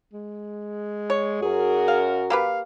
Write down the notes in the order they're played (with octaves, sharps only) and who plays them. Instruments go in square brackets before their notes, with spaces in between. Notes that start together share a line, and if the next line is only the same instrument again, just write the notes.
[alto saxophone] G#3
[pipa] C#5
[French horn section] F#2 F#4 A#4 [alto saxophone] G#4
[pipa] F5
[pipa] A#3 G4 B4 [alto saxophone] F5